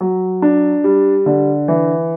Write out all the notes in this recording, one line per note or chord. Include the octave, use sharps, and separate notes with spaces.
F#3
D4
G3
D3
E3